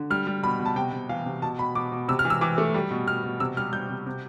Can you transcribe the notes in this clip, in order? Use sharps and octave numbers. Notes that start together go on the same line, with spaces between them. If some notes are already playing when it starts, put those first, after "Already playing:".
Already playing: D3
G3 F6
G3
B2 B5
B2
A5
C3 G5
C3
E3 F5
C3
B2 A5
B2 B5
B2 D6
B2
C3 E6
F6
E3
E6
E3 D6
A3
G3
B2
B2 F6
B2
C3 E6
G3 F6
G3 G6
C3
C3